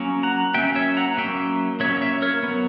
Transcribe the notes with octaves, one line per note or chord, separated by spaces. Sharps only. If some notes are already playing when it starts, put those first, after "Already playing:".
Already playing: F#3 A#3 C#4
F#5 A#5
F#3 A#3 C#4 E5 G5
C#5 E5
F#5 A#5
F#3 A#3 C#4 E5 G5
F#3 A#3 C#4 C#5 E5
C#5 E5
A#4 C#5
F#3 B3